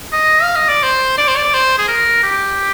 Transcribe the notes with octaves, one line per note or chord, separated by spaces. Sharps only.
D#5
F5
D#5
D5
C5
D5
C5
D5
C5
G#4
A#4
G4